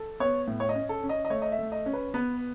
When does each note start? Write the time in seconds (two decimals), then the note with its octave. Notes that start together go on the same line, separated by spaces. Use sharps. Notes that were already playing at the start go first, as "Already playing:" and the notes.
Already playing: A4
0.20 B3 C#5
0.48 A2
0.60 C#5
0.69 D#5
0.75 C#4
0.89 A4
1.04 C#4
1.09 D#5
1.25 D#5
1.30 A3 C#5
1.42 D#5
1.52 E5
1.59 A3
1.72 D#5
1.86 C#4
1.93 B4
2.14 B3 B4